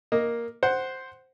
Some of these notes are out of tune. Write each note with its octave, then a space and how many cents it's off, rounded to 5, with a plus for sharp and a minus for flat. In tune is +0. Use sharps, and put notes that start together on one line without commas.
A#3 +5 D#5 +0
C5 +0 F#5 +10